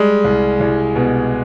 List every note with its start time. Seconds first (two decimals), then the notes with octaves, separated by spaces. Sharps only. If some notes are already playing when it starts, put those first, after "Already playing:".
Already playing: G3 G#3
0.24 C2
0.60 C2
0.96 B2